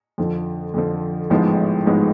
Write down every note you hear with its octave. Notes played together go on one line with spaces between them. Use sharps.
F2 D3 F3
F2 D3 F3
A1 G#2 F3 G#3 B3
A1 G#2 F3 G#3 B3